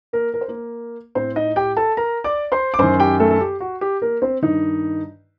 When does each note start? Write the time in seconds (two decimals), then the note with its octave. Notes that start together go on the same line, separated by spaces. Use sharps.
0.13 A#3 A#4
0.34 A#4
0.41 C5
0.48 A#3 A#4
1.15 A2 C4 C5
1.36 D#4 D#5
1.56 G4 G5
1.77 A4 A5
1.97 A#4 A#5
2.24 D5 D6
2.52 C5 C6
2.74 D6
2.79 F#2 D#3 C5 C6
3.00 G4 G5
3.20 A3 A4
3.31 A4
3.40 G4
3.60 F#4
3.81 G4
4.02 A#3 A#4
4.22 C4 C5
4.42 G2 D#3 D#4 D#5